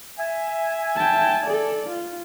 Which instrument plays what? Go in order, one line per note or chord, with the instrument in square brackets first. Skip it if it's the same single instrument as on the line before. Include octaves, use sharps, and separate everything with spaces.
[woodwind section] E5 G#5
[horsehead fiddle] G5 A5
A4 D5
F4